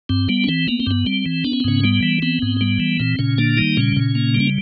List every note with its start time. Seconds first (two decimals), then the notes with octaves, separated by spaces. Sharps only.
0.09 G2 C4
0.29 G3 B3
0.44 C#4
0.49 E3 C4
0.68 A#3 B3
0.80 C4
0.87 G2 B3
1.06 G3 C4
1.26 E3
1.45 B3 D4
1.53 C#4
1.60 C4
1.64 G#2 C#3 C#4
1.84 G3 B3
2.03 E3
2.22 B3 C4
2.42 G#2
2.61 G3 B3
2.80 E3
3.00 A#2 C4
3.19 A#2 C#3 C#4
3.38 D3 A#3 D4
3.57 D#3 G3 D#4
3.77 A#2 C#3 C#4
3.96 A#2
4.15 A#3
4.35 G3
4.40 C#4